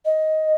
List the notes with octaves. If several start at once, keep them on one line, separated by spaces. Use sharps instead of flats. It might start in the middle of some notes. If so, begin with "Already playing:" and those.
D#5